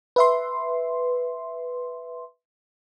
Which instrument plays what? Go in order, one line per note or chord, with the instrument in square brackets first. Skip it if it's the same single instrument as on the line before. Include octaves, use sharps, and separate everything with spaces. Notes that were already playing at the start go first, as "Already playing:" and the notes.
[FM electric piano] B4 E5 C6